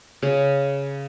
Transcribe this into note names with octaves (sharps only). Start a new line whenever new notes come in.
C#3